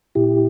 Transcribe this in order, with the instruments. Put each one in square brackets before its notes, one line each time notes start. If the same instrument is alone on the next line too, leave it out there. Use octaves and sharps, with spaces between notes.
[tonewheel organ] A#2 E4 G4